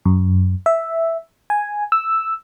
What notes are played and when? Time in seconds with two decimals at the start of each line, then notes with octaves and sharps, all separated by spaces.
0.05 F#2
0.66 E5
1.50 G#5
1.92 E6